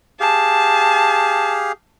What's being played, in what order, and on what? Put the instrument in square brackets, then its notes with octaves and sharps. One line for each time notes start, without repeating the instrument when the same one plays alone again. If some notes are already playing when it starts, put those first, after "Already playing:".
[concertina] G4 G#4 F5 [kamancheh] A5